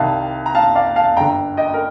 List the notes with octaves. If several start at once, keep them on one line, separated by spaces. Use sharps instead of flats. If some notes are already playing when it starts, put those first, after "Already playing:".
Already playing: C2 C3 D#3 F5 A5
A#5
F5 A5
D5 F5
F5 A5
G1 G2 D3 G5 A#5
D#5 G5
A#4